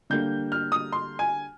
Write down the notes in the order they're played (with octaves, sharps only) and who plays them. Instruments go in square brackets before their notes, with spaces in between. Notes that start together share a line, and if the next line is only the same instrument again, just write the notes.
[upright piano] D3 G3 A#3 G6
F6
D#6
C6
G#5